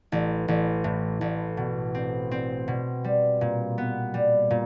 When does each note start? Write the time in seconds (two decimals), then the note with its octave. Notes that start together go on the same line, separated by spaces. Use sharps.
0.12 A1
0.48 A1
0.84 A2
1.21 A1
1.57 B2
1.95 C4
2.31 C4
2.68 B2
3.04 G3
3.41 A#2
3.78 B3
4.14 G3
4.51 A#2